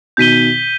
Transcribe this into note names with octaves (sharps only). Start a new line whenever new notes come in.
B2 D#3 G6 B6 D#7 G7